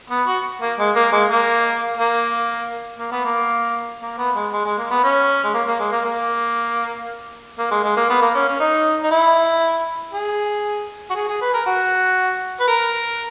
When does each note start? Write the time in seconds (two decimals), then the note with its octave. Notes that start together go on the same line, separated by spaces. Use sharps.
0.10 B3
0.27 F#4
0.61 A#3
0.79 G#3
0.96 A#3
1.12 G#3
1.29 A#3
1.97 A#3
2.99 A#3
3.12 B3
3.25 A#3
4.02 A#3
4.18 B3
4.35 G#3
4.52 G#3
4.65 G#3
4.78 A#3
4.90 B3
5.04 C#4
5.44 G#3
5.54 A#3
5.68 A#3
5.80 G#3
5.92 A#3
6.05 A#3
7.59 A#3
7.71 G#3
7.83 G#3
7.97 A#3
8.09 B3
8.22 A#3
8.35 C#4
8.48 C#4
8.60 D#4
9.03 D#4
9.11 E4
10.13 G#4
11.10 F#4
11.15 G#4
11.28 G#4
11.41 B4
11.54 A#4
11.66 F#4
12.60 B4
12.68 A#4